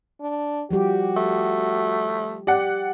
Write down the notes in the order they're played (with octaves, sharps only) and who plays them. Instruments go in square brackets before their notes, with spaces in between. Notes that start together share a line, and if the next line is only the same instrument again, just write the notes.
[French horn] D4
[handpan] F3 G3 G4 [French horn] F#4
[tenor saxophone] A3
[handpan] G4 [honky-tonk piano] D5 F#5